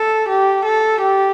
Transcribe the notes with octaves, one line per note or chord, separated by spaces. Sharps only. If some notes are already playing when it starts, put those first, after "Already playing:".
Already playing: A4
G4
A4
G4